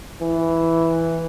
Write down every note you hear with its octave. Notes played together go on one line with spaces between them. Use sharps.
E3